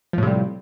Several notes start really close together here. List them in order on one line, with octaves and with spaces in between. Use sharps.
F3 A2 C3 G3